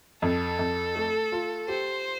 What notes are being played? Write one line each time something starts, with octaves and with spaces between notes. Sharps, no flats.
F2 A4
F2
A3
F4
G4 C5